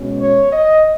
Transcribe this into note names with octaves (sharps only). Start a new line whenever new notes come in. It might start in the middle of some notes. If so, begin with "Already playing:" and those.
Already playing: B2 G#3 C#4
C#5
D#5